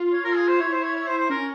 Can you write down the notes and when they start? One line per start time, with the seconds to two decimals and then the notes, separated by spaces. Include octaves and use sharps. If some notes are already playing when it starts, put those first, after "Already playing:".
Already playing: F4
0.12 C#5
0.24 A#4
0.35 G#4
0.48 C5
0.59 E4 C#5
0.72 C5
0.82 C#5
0.95 C#5
1.06 C5
1.18 C5
1.30 C#4 A#4